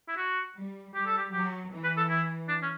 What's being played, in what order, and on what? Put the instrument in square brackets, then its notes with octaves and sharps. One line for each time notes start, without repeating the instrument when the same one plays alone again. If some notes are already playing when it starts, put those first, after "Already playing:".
[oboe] E4
F#4
[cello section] G3
[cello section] G3 [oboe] G4
[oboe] A4
G4
[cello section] F#3 [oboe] G4
[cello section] E3
[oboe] B4
A4
E4
D4
C#4